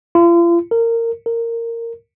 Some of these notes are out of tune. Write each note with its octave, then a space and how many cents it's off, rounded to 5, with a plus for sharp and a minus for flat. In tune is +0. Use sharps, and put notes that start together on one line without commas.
F4 -40
A#4 -20
A#4 -15